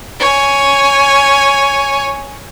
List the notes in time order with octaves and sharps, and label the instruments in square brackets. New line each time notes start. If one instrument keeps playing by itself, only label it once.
[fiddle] C#5 G#5